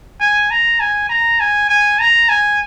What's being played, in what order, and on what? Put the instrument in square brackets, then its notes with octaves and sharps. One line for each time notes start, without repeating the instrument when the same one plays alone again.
[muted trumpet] G#5
A#5
G#5
A#5
G#5
G#5
A#5
G#5